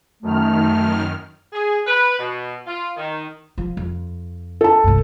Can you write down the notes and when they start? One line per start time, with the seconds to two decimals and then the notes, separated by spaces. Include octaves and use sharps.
0.23 F#2 D#3 A3 F6
1.53 G#4
1.87 B4
2.19 B2
2.67 F4
2.97 D#3
3.58 F3
3.77 F2
4.61 A4 A5
4.84 C2 G2